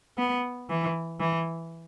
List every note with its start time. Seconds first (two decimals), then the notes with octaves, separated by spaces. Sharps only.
0.18 B3
0.69 E3
1.20 E3